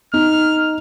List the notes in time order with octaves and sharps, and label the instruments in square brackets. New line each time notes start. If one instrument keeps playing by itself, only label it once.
[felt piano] D#4 [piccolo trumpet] F6